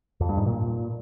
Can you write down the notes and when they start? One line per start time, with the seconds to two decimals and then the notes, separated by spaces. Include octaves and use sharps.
0.20 F2
0.29 G2
0.37 G#2
0.46 A#2